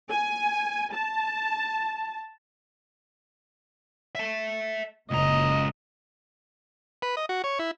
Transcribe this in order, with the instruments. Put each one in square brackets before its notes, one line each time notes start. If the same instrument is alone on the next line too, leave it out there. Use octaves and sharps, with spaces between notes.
[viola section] G#5
A5
[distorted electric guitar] E5 A5
[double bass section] F#1 A#2 C#3 [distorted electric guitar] C#2 A#5 [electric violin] D#5
[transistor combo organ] B4
D#5
F#4
C#5
E4